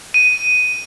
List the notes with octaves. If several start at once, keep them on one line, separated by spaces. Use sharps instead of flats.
D#7